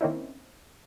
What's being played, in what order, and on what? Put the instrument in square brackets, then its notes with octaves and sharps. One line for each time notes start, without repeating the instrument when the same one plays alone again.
[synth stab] D#3 A#3 C4 C#4 D#4 E4